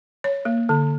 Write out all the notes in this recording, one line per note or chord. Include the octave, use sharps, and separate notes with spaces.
C#5
A#3
D3